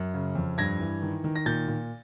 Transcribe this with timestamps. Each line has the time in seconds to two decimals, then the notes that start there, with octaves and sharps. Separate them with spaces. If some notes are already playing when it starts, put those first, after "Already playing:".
Already playing: F#2
0.14 C#3
0.35 F2
0.58 G2 G#6 A#6
0.80 E3
1.02 D#3
1.24 D#3
1.36 A#6
1.46 A#2 G6 A6
1.68 A#2